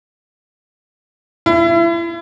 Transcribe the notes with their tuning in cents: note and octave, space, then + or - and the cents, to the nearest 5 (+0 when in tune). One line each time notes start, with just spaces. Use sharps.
E4 +35